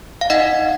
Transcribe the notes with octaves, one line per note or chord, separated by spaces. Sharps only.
F5
D#4 D#5 F#5